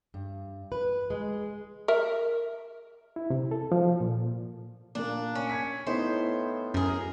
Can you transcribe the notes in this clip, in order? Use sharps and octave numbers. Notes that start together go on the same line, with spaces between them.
G2
B4
G#3
A#4 E5
E4
C3
A4
F3
A#2
A#2 A#3 D4
C#4
G#6 B6 C#7
A2 B3 D#4 E4 C5
F#2 G#4 A#4